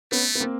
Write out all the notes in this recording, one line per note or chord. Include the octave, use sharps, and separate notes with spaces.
A3 B3 C#4
B3
A#3 C4